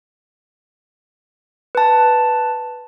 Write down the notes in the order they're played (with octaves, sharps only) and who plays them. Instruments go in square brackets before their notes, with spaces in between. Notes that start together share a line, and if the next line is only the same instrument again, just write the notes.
[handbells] B4 A5